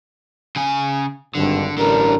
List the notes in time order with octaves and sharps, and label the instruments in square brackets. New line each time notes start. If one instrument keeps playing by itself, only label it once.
[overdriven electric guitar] C#3 G#5
[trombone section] G#1 G2 [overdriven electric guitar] D3
[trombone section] A1 D4 A#4 [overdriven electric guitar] D3 G3